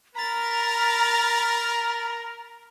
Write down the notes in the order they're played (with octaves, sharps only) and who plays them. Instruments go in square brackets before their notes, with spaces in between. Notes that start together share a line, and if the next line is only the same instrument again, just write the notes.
[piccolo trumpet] A#4 [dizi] A#5 [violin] B5 A6